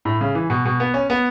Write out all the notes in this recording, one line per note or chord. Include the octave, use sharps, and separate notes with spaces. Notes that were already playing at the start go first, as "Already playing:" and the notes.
A2
C#3
E3
B2
B2
B3
C#4
B3